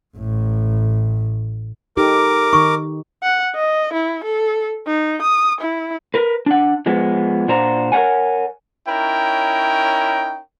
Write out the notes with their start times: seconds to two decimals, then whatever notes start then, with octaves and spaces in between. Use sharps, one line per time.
0.17 A1 A2
1.97 D#4 G4 A4 A#4 D6
2.53 D#3 D#4 C#6
3.23 F#5
3.55 D#5
3.93 E4
4.24 A4
4.87 D#4
5.22 D#6
5.61 E4
6.14 A#4 B4
6.46 D4 F#5
6.86 F3 G#3 B3
7.48 A#2 D4 F#4 C5 A#5
7.92 A#4 B4 C#5 F#5 G#5
8.88 C#4 D#4 E4 A#4 C#5 G5